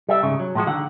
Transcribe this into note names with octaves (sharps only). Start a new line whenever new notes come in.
G3 E5
G#2 C#3
F#3
A2 F3 G#3 F#4
D3 D#3 F#5